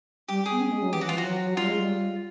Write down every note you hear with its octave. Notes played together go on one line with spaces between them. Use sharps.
G3 G4
G#4
B3
C#4
G#3
F#3
E3 G4
F#4
E3
F4
F3 F#4
F#3
G3 F4
G#3
G3